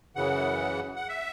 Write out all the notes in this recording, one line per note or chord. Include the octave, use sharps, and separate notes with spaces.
F#2 C#3 E3 F#5
F#5
E5